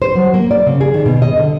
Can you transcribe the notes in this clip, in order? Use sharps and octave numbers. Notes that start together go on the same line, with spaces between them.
C5
F#3
A#3
D5
C#3
G#4
D#3
B2
D#5
D3